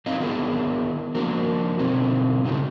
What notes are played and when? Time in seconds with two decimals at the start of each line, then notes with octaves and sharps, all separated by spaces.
0.06 C4 D#4 E4 B4 D#5 F5
0.20 D#3 B3 D4 E4 G#4 A#4
1.15 F3 A#3 D4 F#4 A#4
1.79 B2 D3 C4 D#4 E4
2.44 C#3 C4 D#4 F4 F#4